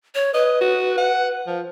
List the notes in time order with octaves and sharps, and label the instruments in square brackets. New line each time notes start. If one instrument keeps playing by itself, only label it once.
[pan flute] C#5
[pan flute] B4 [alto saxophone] D#5
[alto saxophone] F#4
F#5
F3